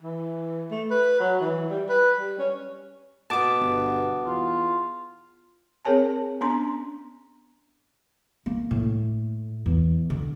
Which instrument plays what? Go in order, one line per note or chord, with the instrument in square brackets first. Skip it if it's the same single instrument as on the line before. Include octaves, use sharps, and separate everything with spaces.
[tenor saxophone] E3
A3
B4
F#3
E3
G3
B4
G3
C#4
[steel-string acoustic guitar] B2 B3 [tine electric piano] A5 D6
[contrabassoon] G1
[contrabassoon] E2 [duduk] F4
[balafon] C4 G#4 A#4 C#5 G#5 A5
B3 C#4 D4 A#5 C6
[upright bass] A#3
A2
E2
D3